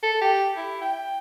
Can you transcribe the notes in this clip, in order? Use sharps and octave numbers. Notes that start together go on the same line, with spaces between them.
A4
G4
E4
G5